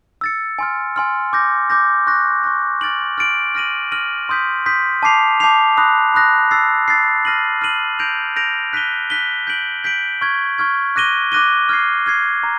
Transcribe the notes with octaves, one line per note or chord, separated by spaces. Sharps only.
E6 A6 C#7
G#5 C6 F6
G#5 C6 F6
D6 G6 A#6
D6 G6 A#6
C#6 F#6 A#6
C#6 F#6 A#6
F6 A6 D7 F#7
F6 A6 D7 F#7
F6 A#6 D#7 F#7
F6 A#6 D#7 F#7
C6 D#6 G6 B6
C6 D#6 G6 B6
A5 D6 G6 C7 F7
A5 D6 G6 C7 F7
B5 D#6 F#6 A#6
B5 D#6 F#6 A#6
E6 A6 C7
E6 A6 C7
F6 A#6 D#7 F#7
F6 A#6 D#7 F#7
G6 A#6 D7 F7
G6 A#6 D7 F7
F#6 B6 D#7 G7
F#6 B6 D#7 G7
G6 B6 D7 F#7
G6 B6 D7 F#7
C#6 F6 G#6
C#6 F6 G#6
D6 F#6 A#6 D#7 G7
D6 F#6 A#6 D#7 G7
F6 G#6 C7
F6 G#6 C7
A#5